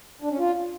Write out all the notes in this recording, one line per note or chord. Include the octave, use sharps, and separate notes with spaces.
D4
C#4
F4